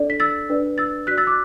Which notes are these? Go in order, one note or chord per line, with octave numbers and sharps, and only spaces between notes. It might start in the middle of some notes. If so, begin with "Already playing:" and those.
Already playing: D4 A4 D5
B6
E6 A6
D4 B4 D5
E6 A6
F#4 D5 F#6 B6
E6 A6
D6 F#6